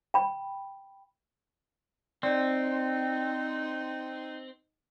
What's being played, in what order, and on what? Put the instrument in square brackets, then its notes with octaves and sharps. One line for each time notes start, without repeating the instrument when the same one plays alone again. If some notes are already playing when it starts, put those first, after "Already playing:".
[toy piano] G5 B5
[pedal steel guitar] C4 [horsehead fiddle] D#4 [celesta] D5